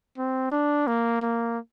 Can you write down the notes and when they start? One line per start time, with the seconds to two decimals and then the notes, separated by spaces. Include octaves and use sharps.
0.18 C4
0.52 D4
0.87 A#3
1.22 A#3